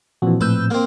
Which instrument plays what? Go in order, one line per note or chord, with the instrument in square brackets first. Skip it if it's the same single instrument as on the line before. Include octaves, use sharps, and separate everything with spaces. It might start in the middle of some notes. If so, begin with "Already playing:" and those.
[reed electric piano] A#2 F3 C4 [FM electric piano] E3 F#4
[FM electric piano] A2 E6 G6 [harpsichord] B4
[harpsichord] A#3 C4